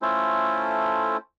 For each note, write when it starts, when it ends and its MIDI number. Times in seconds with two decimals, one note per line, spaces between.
0.02 1.17 57
0.02 1.17 61
0.02 1.17 64
0.02 1.17 65
0.02 1.17 69
0.02 1.17 72